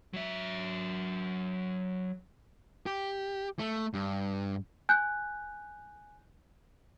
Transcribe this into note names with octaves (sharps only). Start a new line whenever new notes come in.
F#3 E5
G4
A3
G2
G#5 F#6 G6